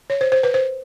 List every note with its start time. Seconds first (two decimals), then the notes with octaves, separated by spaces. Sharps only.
0.10 C#5
0.21 C5
0.32 C5
0.43 B4
0.54 C5